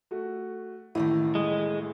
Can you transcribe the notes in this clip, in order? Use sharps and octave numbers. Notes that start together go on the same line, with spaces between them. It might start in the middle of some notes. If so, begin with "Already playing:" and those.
A3 F#4
A1 A2 D#3 A3 A#3 E4
G#3